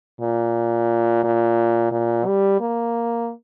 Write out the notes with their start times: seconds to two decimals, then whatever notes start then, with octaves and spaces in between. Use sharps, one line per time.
0.21 A#2
1.24 A#2
1.92 A#2
2.26 G3
2.60 A#3